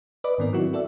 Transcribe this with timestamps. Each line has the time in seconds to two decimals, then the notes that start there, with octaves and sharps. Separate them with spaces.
0.24 B4 D5 D#5 B5 D6
0.38 G#2 D#3 B3 C4 A#4
0.53 F#3 C4 E4 F#4
0.73 F#4 A4 D5 E5